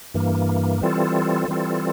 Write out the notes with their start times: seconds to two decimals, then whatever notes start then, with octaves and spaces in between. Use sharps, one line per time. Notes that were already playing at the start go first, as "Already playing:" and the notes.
0.14 G2 E3 A#3
0.81 E3 G3 C4 F4 A4
1.48 E3 G3 C4 F4 A4